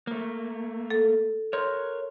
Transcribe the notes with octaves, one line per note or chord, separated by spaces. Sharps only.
A3 A#3
A4
A#4 C#5 C6